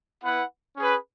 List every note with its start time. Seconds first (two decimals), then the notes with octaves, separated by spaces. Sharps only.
0.22 B3 E4 B4 F#5
0.76 C#4 G#4 B4